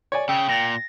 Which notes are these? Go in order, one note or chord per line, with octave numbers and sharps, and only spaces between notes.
C#5 D5 G#5
C#3 G5 E6
A#2 A6 A#6